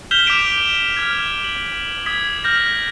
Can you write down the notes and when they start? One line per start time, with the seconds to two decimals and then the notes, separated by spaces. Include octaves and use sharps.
0.11 F6 G6 B6 E7 F7 G7
0.26 D6 G6 B6 D7 E7
0.97 F6 G#6
1.44 F#7
2.06 D#6 G#6 B6
2.44 F6 G6 A#6